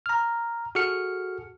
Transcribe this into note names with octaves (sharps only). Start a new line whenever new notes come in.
A#5 F6
F#4 G#4 A4 F6 C#7